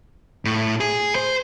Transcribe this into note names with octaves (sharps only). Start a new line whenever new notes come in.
A2
G#4
C5